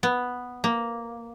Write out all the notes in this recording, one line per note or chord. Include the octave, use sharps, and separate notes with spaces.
B3
A#3